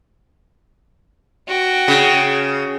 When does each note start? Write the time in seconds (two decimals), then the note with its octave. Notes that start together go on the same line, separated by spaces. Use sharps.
1.48 F#4 G5
1.88 C#3